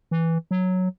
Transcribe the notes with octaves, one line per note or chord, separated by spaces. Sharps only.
E3
F#3